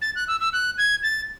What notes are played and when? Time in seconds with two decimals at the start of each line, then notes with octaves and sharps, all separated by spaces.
0.02 A6
0.15 F#6
0.28 E6
0.40 E6
0.53 F#6
0.78 G#6
1.03 A6